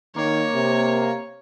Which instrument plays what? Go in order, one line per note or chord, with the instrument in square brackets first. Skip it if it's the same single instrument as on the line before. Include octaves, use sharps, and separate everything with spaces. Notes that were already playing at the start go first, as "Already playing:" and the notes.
[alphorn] D#3 [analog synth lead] A#3 [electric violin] C#5
[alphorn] C3